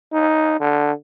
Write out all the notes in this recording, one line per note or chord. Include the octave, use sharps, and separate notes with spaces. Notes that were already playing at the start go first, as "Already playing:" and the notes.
D#4
D3